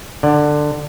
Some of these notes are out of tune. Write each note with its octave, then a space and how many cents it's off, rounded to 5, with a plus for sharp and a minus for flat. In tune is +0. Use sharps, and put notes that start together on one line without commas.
D3 +15 D5 +0